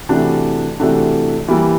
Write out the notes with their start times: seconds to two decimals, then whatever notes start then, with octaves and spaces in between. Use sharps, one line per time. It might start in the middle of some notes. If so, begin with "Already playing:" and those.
0.09 C3 E3 A3 D4 F#4
0.79 C3 E3 A3 D4 F#4
1.48 E3 G3 A#3